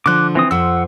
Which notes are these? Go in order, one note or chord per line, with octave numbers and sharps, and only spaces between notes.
D3 F3 D6 F#6
E3 C4 D#6
F2 F3 F#5 E6